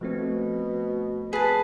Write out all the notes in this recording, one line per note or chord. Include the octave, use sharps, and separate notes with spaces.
B2 F3 A3 C4
G#4 B4 A5